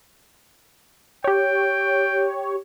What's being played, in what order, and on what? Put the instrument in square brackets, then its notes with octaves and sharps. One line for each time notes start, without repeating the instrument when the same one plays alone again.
[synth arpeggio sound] G4 C#5 [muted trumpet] G5